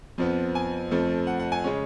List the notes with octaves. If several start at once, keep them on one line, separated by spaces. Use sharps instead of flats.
F2 F3 B3
G#5
F2 F3 A3
F#5
F#5
G#5
C#3 G#3 C#4